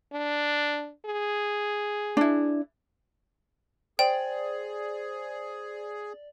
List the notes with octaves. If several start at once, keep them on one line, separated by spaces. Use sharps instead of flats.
D4
G#4
D4 E4
G#4 C5 D5 G5